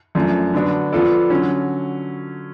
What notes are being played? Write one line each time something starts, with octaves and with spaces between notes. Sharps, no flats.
F#2 F3 A3 D4
D3 F#3 B3 D4 F#4
F3 B3 F4 A4 D5
D3 F#3 C#4